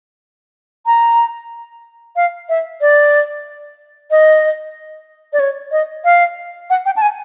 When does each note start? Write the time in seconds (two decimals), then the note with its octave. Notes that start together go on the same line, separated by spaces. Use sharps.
0.86 A#5
2.16 F5
2.49 E5
2.81 D5
4.11 D#5
5.33 D5
5.40 C#5
5.72 D#5
6.05 F5
6.70 F#5
6.86 G5
6.97 A5
7.02 G#5